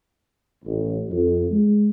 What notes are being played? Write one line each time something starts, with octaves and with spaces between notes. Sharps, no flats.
A1
F2
G#3